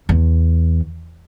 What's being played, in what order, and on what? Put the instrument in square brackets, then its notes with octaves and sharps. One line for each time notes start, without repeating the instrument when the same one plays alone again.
[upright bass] E2